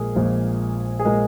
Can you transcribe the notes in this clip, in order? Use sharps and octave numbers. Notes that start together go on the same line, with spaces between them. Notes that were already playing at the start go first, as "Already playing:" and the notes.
Already playing: A#1 A#2 G#3 G#4 A#4
A#1 A#2 G#3
G#4
A#2 G#3 A#4